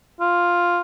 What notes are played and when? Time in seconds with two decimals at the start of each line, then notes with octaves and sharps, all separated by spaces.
0.20 F4